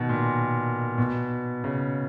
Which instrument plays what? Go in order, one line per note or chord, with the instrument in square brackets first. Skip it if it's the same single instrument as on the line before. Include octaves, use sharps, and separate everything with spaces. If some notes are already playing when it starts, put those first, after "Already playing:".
Already playing: [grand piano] B2 D#3
A#2
B2
C#3